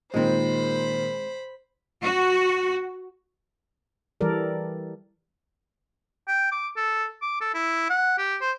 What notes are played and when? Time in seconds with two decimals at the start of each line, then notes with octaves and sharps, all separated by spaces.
0.14 A#2 D#3 G#3 C4 C5 B5
2.01 F#4
4.21 E3 G3 A4 A#4 D5
6.28 G5
6.51 D6
6.77 A4
7.22 D6
7.41 A4
7.54 E4
7.90 F#5
8.18 G4
8.41 C5